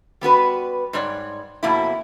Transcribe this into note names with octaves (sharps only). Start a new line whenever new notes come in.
G3 B3 F#4 B4
G#2 G3 C#5 D5
F2 B2 A#3 C4 E4